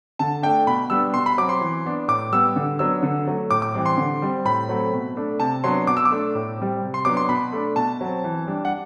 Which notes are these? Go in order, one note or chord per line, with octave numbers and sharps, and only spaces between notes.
D3 A5
A3 D4 G5
B2 B5
G3 B3 D4 E6
B2 C6
B5
F#3 C4 D6
C6
E3
B3 D4
A2 D6
G3 B3 E6
D3
F#3 B3 D4 E6
D3
F#3 A3
A2 D6
D6
E3 G3 C4
C6
D3
G3 C4
A2 B5
F#3 A3 C4
B2
A3 D4
C3 A5
F#3 B3 D4 C6
B2 D6
E6
D6
A3 D4
A2
G3 C4
C3
C6
F#3 B3 D4 D6
C6
B2 B5
A3 D4
B2 A5
F#3 C4
E3
G3 D4
F#5